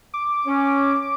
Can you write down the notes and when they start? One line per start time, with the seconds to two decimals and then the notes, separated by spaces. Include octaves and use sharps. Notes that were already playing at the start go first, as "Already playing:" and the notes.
0.14 D6
0.47 C#4